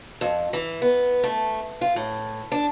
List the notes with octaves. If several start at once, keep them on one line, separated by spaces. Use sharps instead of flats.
F2
E3
B3
A3
F4
A2
D4